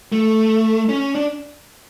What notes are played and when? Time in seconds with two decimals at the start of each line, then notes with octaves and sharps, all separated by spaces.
0.12 A3
0.89 C#4
1.15 D4